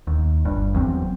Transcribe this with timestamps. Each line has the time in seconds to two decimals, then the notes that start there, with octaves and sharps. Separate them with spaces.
0.07 D#2
0.45 G1 G2
0.73 F#1 E2 F#3 C4